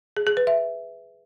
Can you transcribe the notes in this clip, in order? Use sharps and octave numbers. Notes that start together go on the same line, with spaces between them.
G#4
G#4
B4
E5